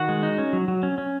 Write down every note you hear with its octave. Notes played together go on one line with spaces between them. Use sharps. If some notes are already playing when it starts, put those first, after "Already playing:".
Already playing: D#3 F#4 F#5
G#3
D#4
C#4
F#3
F#3
C#4
C#4